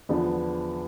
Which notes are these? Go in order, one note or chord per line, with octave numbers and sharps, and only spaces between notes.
E2 D3 F3 B3 D4